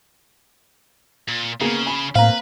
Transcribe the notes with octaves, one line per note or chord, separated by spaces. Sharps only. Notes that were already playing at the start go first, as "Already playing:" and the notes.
A#2
C#3 A#3 B3 G#4
G#5 B5
A2 A#3 C4 B4 F5 A#5